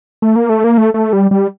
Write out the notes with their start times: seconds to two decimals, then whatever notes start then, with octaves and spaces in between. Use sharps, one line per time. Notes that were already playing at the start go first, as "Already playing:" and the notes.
0.22 A3
0.36 A#3
0.49 A3
0.64 A#3
0.78 A3
0.94 A3
1.13 G3
1.31 G3